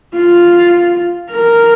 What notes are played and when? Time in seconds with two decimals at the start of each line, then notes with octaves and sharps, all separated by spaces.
0.14 F4
1.30 A#4